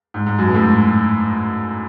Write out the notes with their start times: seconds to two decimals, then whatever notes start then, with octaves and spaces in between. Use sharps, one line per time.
0.14 G#2
0.26 G#2
0.38 F#2
0.46 B2
0.54 A2
0.62 G#2